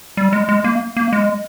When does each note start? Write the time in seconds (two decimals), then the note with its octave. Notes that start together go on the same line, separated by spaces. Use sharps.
0.17 G3
0.33 G#3
0.49 G#3
0.64 A#3
0.96 A#3
1.13 G#3